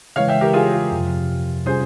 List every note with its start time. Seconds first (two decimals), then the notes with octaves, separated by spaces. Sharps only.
0.16 C#3 E3 G#3 C#5 F5
0.28 E5 G5
0.41 G4 A#4
0.53 F4 G#4
0.72 F4
0.91 F2 C3 F3
1.66 C3 G3 C#4 F4 G#4 C5